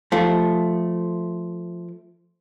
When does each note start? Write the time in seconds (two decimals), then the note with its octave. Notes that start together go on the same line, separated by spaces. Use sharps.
0.12 F3 A3